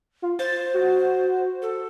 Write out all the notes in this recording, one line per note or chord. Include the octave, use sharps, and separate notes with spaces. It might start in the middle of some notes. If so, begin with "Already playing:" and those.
F4
C5 A6
F#4
A4